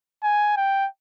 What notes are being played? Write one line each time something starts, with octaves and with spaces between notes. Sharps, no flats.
G#5
G5